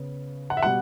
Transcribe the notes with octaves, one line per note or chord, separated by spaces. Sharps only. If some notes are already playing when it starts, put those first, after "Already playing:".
Already playing: C#3 B3
F#5
E5
B2 G3 F#5